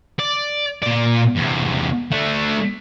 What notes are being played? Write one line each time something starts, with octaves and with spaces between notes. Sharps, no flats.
D5
A#2 D5
E2 C3
A3 D4